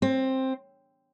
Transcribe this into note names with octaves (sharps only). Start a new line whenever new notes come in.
C4